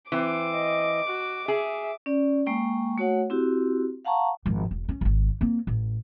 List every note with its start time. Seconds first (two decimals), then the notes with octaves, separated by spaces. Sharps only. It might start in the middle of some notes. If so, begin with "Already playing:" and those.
0.12 E3 C4 D6
0.54 D#5
1.07 F#4
1.48 G#4 E5
2.06 C#4 D5
2.46 G#3 A#3 G5 C#6
2.98 A3 F#4 C#5 F#5
3.30 C4 E4 F#4 G4
4.05 F5 F#5 A5 A#5 C#6
4.46 G#1 F3
4.71 E1
4.89 C#4
5.01 D1 G#1
5.41 A#3 C4
5.67 A1